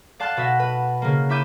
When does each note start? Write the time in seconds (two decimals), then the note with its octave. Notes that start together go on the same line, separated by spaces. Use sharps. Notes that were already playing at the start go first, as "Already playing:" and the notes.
0.20 D5 F5 A5 C6 F#6 A6
0.37 B2 F#4 D#5 E5
0.59 B4
1.02 C#3 A#3
1.29 E4 E5 D6 G6 D#7